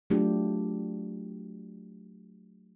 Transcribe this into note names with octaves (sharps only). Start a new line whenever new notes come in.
F#3 A3 D4 F4 G4